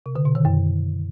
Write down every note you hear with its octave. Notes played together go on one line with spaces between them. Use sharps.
C3
D3
B2
D#3
F#2